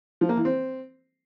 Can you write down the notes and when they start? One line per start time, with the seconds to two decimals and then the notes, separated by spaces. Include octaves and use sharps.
0.21 F3
0.29 A#3
0.37 E3
0.45 C4